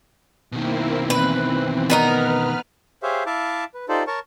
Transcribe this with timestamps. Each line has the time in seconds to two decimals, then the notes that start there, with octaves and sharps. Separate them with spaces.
0.52 B2 D#3 A#3 C4 E4
1.10 E3 C4 B4
1.90 B3 D#4 A#4 B4 F6
3.03 G4 G#4 C5 C#5 E5 F5
3.26 E4 E5 F5 A5 D6
3.74 B4
3.89 D#4 F4 G4 A4 C5 D5
4.07 A#4 C#5 A5 C#6